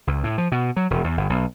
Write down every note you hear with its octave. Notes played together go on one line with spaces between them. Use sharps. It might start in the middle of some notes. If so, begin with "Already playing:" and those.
C#2
A2
F3
B2
F#3
E1
E2
G1
B1